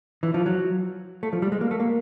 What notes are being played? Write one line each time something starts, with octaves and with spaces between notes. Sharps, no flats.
E3
F3
F#3
A3
F3
G3
G#3
A#3
A3
A#3